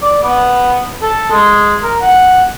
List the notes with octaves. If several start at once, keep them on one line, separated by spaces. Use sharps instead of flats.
D5
B3
A4
G#3
A#4
F#5